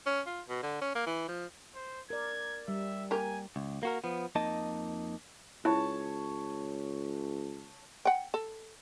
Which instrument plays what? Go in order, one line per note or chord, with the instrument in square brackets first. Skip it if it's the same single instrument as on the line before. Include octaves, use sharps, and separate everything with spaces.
[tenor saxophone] C#4
F4
B2
D3
C#4
A#3
E3
F3
[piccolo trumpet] C5
[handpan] A#4 D5 [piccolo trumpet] G#6
[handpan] G3 [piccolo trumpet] E5
[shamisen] A#3 G4 A#4 [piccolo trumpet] G#5
[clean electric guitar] C#2
A#3 F#4 A#4
F3 B3
F2 A#3 D#4 D#5 A5
[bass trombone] C#2 [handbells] E4 [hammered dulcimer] C#5 A5
[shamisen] F#5 G5
A4